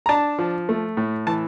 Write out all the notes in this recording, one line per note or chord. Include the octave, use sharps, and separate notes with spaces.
A#5
D4 A5
F3
A3
A2
E3 A5